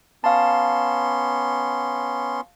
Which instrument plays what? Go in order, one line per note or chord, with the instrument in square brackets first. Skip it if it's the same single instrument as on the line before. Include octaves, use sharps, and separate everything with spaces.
[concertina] B3 C#4 C6 [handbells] F5 A5